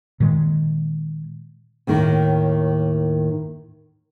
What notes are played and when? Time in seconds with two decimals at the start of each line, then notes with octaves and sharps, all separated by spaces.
0.20 A#2 D#3 G#3
1.87 D#2 A2 D#3 A#4